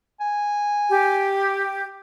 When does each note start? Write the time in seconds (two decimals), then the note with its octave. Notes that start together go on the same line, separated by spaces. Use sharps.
0.20 G#5
0.89 G4